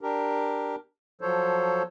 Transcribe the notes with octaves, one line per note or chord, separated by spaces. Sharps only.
D4 G4 A#4
F3 F#3 A4 C5 C#5